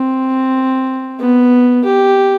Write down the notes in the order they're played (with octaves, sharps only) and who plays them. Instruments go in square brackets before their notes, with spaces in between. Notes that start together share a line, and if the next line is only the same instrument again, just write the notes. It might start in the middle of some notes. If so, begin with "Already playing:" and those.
Already playing: [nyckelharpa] C4
B3
G4